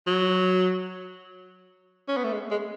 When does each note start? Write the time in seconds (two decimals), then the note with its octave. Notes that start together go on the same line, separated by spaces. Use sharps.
0.07 F#3
2.08 C#4
2.17 B3
2.24 A3
2.33 G#3
2.51 G#3